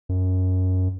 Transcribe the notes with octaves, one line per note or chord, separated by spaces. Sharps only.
F#2